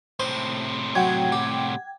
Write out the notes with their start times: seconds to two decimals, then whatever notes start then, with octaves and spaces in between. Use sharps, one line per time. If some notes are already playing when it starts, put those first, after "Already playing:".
0.20 A2 C3 C5
0.95 F#3 F#5 G5 G#6
1.32 G4